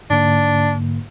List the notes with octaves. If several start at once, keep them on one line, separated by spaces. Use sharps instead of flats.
G#2 D3 A#3 D4